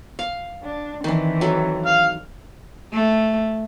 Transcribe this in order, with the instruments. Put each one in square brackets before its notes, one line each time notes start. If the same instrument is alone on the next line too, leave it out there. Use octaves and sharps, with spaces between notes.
[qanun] F5
[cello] D4
[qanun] D#3 D4 [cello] E3 C4
[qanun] F#3 A4
[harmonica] F5
[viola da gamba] A3